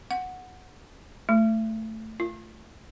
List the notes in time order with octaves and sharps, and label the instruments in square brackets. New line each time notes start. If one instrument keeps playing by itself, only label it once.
[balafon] F#5
A3
F4